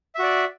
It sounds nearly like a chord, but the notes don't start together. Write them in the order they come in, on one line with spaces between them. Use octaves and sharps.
E5 F#4 D5